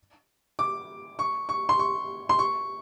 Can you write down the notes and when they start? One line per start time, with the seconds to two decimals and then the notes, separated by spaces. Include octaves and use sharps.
0.59 D6
1.19 C#6
1.49 C#6
1.69 C6
1.79 C#6
2.29 C6
2.39 C#6